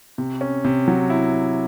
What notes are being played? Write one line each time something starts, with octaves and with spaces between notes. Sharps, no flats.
C3
C#4
C3
F#3
E4